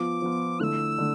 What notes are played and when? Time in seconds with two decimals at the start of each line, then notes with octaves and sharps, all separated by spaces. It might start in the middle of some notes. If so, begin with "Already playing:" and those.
Already playing: F3 B3 F4 D6
0.22 F3 B3 F4
0.59 D3 A3 E4 E6 F#6
0.98 D3 A3